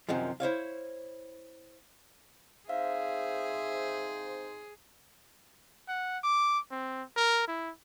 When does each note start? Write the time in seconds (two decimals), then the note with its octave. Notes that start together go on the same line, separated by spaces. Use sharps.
0.09 F#2 C3 D#3 F3
0.40 E4 C5 C#5 F5
2.69 C4 D#4 G#4 C5 E5 F5
5.88 F#5
6.23 D6
6.71 C4
7.17 A#4
7.48 E4